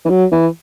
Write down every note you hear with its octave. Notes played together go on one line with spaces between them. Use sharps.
E3
F#3
E3